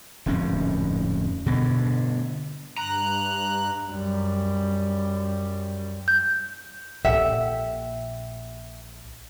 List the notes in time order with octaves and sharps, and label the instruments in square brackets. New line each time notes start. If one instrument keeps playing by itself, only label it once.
[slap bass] D1 F2 G#2 C#4
G2 B2 D3
[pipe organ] G2 F#6 [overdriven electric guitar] A#5
[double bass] F#2 G3
[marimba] G6
[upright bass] A#1 A#2 [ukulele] G4 A4 F#5 [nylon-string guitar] E5